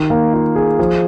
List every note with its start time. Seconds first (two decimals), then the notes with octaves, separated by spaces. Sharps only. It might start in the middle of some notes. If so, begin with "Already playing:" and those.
Already playing: D#3
0.10 A#3
0.33 F4
0.56 G#4
0.79 F3